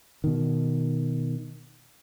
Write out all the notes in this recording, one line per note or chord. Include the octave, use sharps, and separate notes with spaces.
B2 D#3